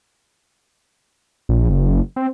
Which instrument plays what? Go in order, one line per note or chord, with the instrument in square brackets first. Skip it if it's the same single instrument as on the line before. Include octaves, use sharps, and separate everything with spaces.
[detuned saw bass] A#1
F#1
C4